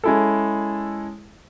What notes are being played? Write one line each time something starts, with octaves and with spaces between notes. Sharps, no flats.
G#3 C#4 E4 G#4 A4